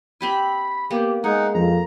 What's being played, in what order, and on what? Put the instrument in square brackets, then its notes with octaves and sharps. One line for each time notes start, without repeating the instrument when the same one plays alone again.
[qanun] C4 G4 G#5 [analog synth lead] B5
[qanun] A#3 B3 [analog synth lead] G4
[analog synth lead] G#3 [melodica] D#4 F#5 [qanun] G#4
[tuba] F2 [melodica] A#5